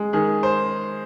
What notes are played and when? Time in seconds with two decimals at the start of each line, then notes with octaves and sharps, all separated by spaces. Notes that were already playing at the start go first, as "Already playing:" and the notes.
Already playing: G#3
0.13 D#3 G#4
0.43 C5